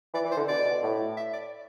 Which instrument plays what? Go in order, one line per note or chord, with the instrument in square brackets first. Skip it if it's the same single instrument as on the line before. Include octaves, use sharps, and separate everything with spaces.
[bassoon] E3 [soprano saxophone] D5
[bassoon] E3
[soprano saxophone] C5
[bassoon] D3
[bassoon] B2 [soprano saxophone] D5
[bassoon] B2
A2
[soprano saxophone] E5
D5